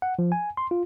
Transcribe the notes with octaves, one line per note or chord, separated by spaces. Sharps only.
F#5
F3
G#5
C6
F4